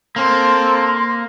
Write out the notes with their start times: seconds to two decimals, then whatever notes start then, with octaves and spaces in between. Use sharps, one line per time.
0.16 A#3 C4 A4 C6